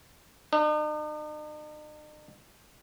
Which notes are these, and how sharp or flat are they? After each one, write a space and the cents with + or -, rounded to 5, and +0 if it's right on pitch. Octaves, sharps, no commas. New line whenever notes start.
D#4 -45